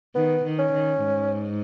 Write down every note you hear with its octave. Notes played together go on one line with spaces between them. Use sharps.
D#3 B3
D#3
C#4
D#3
G#2